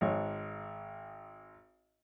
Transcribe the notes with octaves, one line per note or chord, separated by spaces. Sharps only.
G#1 G#2 C#5